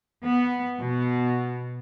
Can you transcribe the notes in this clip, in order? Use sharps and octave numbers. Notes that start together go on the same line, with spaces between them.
B3
B2